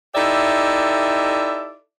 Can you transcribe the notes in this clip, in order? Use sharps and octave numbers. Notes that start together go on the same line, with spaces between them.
D#4 E4 G4 A4 D5 E5